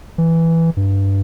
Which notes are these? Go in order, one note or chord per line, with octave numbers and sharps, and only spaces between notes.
E3
G2